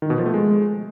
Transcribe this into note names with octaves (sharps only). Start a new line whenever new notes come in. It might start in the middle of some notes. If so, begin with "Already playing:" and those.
D#3
B2
F3
A3
G#3